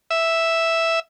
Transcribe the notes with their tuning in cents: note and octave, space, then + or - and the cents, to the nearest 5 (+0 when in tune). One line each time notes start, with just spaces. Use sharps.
E5 +0